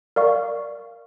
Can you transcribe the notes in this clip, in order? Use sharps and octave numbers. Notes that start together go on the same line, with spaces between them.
A#4 D5 F5 C#6